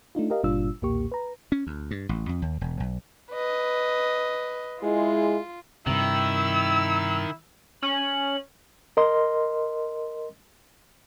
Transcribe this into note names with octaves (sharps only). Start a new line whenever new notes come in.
A3 D4 D#4 F4
G4 A#4 D#5 F5
G1 A#2 G3 D4 F4 E6
B1 E2 A#2 A#3 G4 C#6
B4 A#5
C#4
D2
G2
A1
F2
D#2
E1
B1
B4 D#5
G#3 E4 F4
G2 C3 D#3 E4 E6
C#4 F#7
A#4 D#5 C6